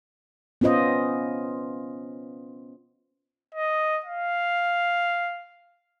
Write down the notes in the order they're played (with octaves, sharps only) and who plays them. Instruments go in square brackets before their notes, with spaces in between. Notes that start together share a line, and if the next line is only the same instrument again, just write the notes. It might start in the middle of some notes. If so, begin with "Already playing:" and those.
[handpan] B3 C#4 F4 C5 D#5
[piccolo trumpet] D#5
F5